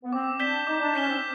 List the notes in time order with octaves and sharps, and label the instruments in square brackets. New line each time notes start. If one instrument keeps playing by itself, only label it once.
[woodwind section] B3
[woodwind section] C4 [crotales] D6
[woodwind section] D4 [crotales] G6 B6 E7 G7
[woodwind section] D#4 [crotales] D6
[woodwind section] D4
[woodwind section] C#4 [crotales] G6 B6 E7 G7
[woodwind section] C4